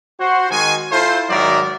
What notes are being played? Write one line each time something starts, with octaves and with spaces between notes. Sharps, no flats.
F#4 C5
D#3 G#3 F#4 G#5
E4 F4 A4 C5
G#2 D#3 F#3 A#4 D5 E5